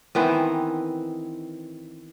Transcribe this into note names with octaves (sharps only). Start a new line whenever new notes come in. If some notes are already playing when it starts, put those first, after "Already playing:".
D#3 E3 B3 C4